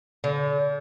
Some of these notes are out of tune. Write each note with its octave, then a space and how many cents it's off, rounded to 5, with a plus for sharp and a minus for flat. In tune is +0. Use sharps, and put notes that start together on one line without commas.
D3 -40